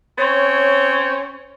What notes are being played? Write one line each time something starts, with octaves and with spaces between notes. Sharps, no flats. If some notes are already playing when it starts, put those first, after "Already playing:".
C4 C#4 C#5